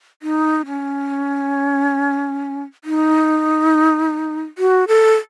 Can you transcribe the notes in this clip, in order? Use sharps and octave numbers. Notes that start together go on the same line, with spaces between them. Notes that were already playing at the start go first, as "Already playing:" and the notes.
D#4
C#4
D#4
F#4
A4